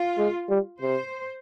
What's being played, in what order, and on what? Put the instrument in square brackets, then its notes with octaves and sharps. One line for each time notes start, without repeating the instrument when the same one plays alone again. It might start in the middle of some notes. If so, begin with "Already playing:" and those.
Already playing: [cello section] F4
[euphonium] G#3
G3
[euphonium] C3 [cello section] C5